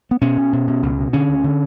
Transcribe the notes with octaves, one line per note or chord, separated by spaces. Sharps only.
B3
B2 C#4
B2
B2
B2
C#2
B2
D3 C#4
D2
D3